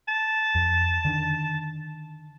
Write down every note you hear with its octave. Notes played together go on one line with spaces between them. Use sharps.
A5
F2
D3 D#3 D4